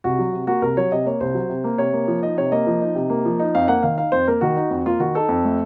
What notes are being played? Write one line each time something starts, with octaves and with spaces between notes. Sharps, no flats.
C2 F#4
F#3
C3
A#3 F#4
C2 A#4
F#3 C#5
C3 D#5
A#3 C#5
C2 C5
F#3
C3
A#3
C3 C#5
A#3
F3
D#4 D#5
C3 C#5
A#3 D#5
F3
D#4
C3
A#3
F3
D#4
F2 F5
A#3 F#5
D#3 F5
D#4 F5
F2 C5
A#3 A#4
D#3 F#4
D#4
F2
A#3 F4
D#3 F#4
D#4 A4
F2
A3